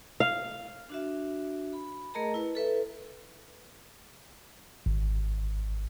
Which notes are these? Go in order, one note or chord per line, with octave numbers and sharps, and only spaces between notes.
F5
D4 F#4 E5
B5
A3 G#4 A#4 D#5 A5 A#5
E4 B4
A4 B4 E5
G#1